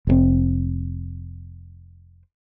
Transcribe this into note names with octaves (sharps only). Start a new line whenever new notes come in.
F1 C3 C4